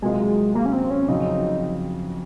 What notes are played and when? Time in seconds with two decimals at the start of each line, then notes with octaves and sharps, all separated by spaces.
0.02 C3 F#3 G#3 A#3 F4
0.55 A#3
0.66 C#4
0.73 C4
0.91 C#4
1.08 F2 C#3 F#3 C4 D#4